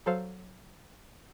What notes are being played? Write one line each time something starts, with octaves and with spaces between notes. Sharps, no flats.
F#3 A4 C5 F5